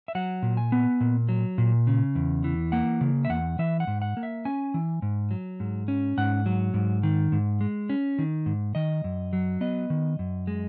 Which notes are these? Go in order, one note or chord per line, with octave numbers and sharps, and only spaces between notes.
E5
F#3 F#5
A#2
G#5
B3
A#2
F#3
A#2
C#3
E2
E3
A#3 F#5
C#3
E5
E2 F#5
E3 E5
F#5
G#2
F#5
A#3
E5
C#4 G#5
E3
G#2
F#3
G#2
C#4
G#2 F#5
F#3
G#2
D#3
G#2
G#3
C#4
D#3
G#2
D#3 D#5
F#2
F#3
B3 D#5
D#3
F#2
G#3